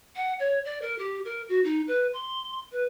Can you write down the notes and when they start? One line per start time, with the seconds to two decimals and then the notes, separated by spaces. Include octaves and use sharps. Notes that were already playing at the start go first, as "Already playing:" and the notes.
0.15 F#5
0.39 C#5
0.64 D5
0.81 A#4
0.98 G4
1.24 A#4
1.48 F#4
1.63 D#4
1.87 B4
2.13 C6
2.71 B4